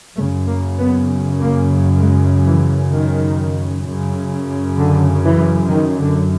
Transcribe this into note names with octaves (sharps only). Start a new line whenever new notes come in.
F#2 C#3 A3
A#3
B3
A#3
G#3
E3
D#3
F#2 C#3
D3
E3
D#3
D3